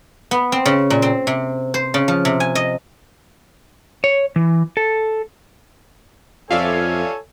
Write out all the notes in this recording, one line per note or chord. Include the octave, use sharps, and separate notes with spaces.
B3
C4
C#3
A#2
C4
C3
C5
C#3
F3
C3
G#5
D#5
C#5
E3
A4
F2 F4 A4 C#5 D5 E5 F5 G#5